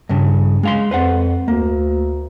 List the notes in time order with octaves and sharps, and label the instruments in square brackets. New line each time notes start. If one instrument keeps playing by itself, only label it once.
[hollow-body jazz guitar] G2 C#3
G#3 F5 C6
[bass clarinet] F2 [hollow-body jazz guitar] B4 C5 F#5
[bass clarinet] D2 [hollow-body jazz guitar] A#3